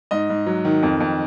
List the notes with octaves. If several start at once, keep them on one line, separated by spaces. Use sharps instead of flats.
G#2 D#5
G#2
F#3
D#3
F2
F2